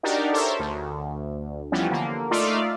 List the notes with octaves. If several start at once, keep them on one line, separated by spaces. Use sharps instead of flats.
D4 D#4 F#4 G4 A#4 D5
A4 A#4 C5 C#5 E5
D2
E3 F3 G3 B3 C#4
D3 A#3
A3 D#4 F4 D5 E5 F5